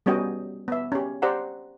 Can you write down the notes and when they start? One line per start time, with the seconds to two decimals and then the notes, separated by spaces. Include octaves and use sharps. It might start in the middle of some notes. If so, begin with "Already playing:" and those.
0.06 G3 B3 C#4 F#4 D#5 G5
0.68 B3 E5
0.92 C#4 G4
1.22 G4 C5 D5 F#5 A#5